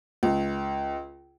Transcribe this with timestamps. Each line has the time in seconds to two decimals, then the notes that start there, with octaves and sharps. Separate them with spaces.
0.23 C#2